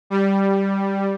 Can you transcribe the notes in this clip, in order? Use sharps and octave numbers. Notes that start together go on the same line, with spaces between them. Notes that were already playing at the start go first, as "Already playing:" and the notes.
G3